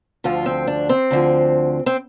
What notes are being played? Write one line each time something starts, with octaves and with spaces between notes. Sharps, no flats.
D2 D3 F3 F4
C4
D4
C4
D2 D3 F3
C4